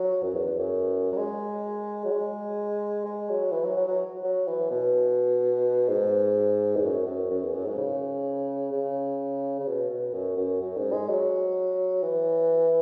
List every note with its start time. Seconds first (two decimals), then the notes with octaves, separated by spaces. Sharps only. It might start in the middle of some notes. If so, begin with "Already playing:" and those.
Already playing: F#3
0.23 F#2
0.34 E2
0.46 E2
0.58 F#2
1.12 F#3
1.17 G#3
2.05 F#3
2.11 G#3
3.05 G#3
3.30 F#3
3.52 E3
3.65 F#3
3.76 F#3
3.88 F#3
4.24 F#3
4.48 E3
4.71 B2
5.89 G#2
6.77 E2
6.84 F#2
7.07 F#2
7.31 F#2
7.43 E2
7.55 F#2
7.67 G#2
7.78 C#3
8.72 C#3
9.60 C#3
9.67 B2
9.90 B2
10.13 F#2
10.37 F#2
10.62 F#2
10.77 G#2
10.93 G#3
11.09 F#3
12.03 E3